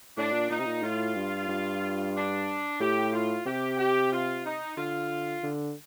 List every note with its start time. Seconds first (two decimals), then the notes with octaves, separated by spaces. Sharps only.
0.17 A2 D4
0.33 A#2
0.50 A#2 D#4
0.59 C3
0.66 A#2
0.82 A2 F4
1.15 G2
1.48 G2
2.14 D4
2.80 A2 G4
3.13 F4
3.46 C3 G4
3.79 G4
4.11 F4
4.45 D#4
4.77 D3 F4
5.43 D3